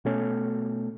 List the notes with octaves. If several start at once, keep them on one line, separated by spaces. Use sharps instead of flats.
B2 A3 C#4